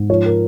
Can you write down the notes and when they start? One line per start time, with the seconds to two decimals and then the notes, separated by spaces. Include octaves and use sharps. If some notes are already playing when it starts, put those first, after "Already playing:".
Already playing: G#2
0.10 F3 C#5
0.26 A#4